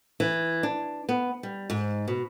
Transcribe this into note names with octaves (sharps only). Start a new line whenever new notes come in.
E3
D4
B3
G3
G#2
B2